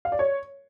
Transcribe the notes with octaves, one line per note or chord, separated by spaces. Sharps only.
F5
D5
C#5